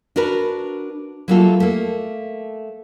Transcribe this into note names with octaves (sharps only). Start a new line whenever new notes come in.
D4 F#4 A#4 B4
F#3 G3 A3 A#3 F4 A4
A3 A#3